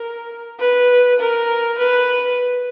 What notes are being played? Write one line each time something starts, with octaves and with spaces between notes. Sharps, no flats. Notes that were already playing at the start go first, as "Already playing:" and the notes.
Already playing: A#4
B4
A#4
B4